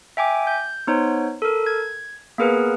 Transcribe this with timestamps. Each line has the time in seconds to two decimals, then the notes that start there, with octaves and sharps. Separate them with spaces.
0.17 E5 G5 G#5 D6
0.47 G6
0.87 B3 D#4 C5 C#5
1.42 A4 A#4
1.66 G#6
2.38 A#3 B3 G#4 A#4 B4